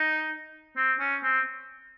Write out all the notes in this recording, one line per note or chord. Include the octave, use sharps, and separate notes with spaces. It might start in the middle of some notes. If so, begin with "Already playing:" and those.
Already playing: D#4
C4
C#4
C4